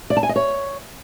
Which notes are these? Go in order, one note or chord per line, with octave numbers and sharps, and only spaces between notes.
D5
A5
G#5
D#5
C#5